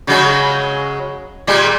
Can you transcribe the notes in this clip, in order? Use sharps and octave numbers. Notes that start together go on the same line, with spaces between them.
C#3 F#3 G#3
A#2 G3 G#3